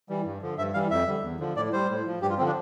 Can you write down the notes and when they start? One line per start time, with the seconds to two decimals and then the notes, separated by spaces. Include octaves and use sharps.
0.09 E3 G3
0.25 G2
0.41 D3 F3
0.58 G2 E5
0.74 E3 G3 F5
0.91 F2 E5
1.07 D3 G3
1.23 E2
1.39 D3 F3
1.56 A2 D5
1.73 G3 C5
1.89 A2
2.06 F3
2.22 G2 G4
2.30 F4
2.38 D3 F3 C4
2.46 D4